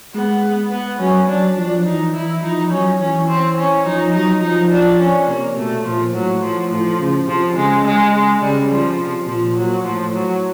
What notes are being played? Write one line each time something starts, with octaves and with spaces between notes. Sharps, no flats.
G#3 B3
B3
F#3 C#4
F#3 D4
F3 D4
E3 D#4
E3 E4
F3 D#4
F#3 C#4
E3 C#4
C4
C#4
F3 D#4
F#3 D#4
F3 D#4
D4
C#4
C3 A#3
B2 A3
A#2 F3
A2 F#3
F3
A2 F3
C#3
C3 F3
C#3 G#3
G#3
C#3
C#3 G3
F3
C3
A#2 F3
F#3
A2 F3
F#3